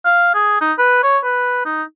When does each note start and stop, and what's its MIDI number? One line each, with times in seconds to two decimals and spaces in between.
0.05 0.33 77
0.34 0.57 68
0.61 0.73 63
0.78 1.02 71
1.03 1.18 73
1.24 1.63 71
1.65 1.83 63